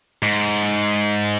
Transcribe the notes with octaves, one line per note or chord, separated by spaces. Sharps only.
G#2